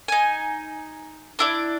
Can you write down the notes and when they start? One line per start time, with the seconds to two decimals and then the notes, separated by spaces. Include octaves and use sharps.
0.08 D#4 G#5
1.39 D4 E4 D5